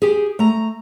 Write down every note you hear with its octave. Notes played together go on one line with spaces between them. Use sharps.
G4 G#4
A3 A#5